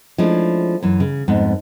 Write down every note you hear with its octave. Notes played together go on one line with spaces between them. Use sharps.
F3 G#3 A3 C#4 D4 E4
F#2 E3
C#3
F2 G#2 B3